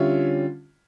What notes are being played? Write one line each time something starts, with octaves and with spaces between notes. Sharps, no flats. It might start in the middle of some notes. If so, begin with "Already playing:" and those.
Already playing: D3 G3 C#4 F4 C#5 E5